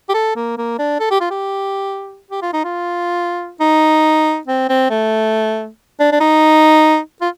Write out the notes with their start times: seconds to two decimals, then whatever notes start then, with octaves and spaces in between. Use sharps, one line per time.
0.09 G4
0.14 A4
0.36 A#3
0.57 A#3
0.79 D4
1.00 A4
1.11 G4
1.20 F4
1.31 G4
2.31 G4
2.42 F4
2.53 D#4
2.65 F4
3.60 D#4
4.47 C4
4.69 C4
4.90 A3
6.00 D4
6.12 D4
6.20 D#4
7.21 F4